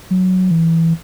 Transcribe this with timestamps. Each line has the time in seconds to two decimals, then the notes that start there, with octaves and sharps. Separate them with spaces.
0.11 F#3
0.51 E3